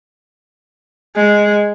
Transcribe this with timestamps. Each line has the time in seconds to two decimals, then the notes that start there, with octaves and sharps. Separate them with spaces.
1.16 G#3